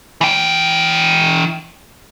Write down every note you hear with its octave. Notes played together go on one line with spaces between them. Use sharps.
E3 G5